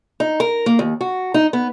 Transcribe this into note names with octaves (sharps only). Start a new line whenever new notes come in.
D#4
A#4
A#3
D#2
F#4
D#4
B3